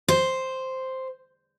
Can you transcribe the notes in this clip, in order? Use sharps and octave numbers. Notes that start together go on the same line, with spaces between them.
C5